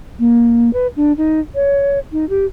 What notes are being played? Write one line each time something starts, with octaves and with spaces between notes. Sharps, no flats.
A#3
B4
D4
D#4
C#5
D#4
G4